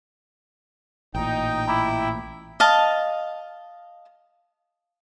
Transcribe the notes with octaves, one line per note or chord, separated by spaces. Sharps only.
A1 A#2 D#4 G5
E4 A#5 B5 D6
D#5 F5 A5